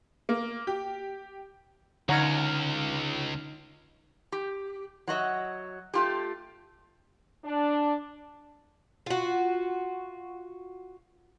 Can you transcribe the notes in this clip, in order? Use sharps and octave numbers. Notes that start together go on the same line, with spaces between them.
A#3
G4
C#2 D3 D#4 C#5 F#5 A#5 F6
G4
F#3 F#4 D#5 E5
A3 F4 G4
D4
F4 F#4